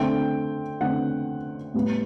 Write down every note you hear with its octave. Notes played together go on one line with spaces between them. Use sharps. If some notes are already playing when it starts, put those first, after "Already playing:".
Already playing: D3 A3 C4 G5
D3 A3 C4 F#5
A2 G3 B3